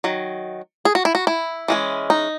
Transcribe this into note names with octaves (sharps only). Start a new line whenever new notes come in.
D#3 F#3
G#4
F#4
E4
F#4
E4
E3 G#3 C#4
D#4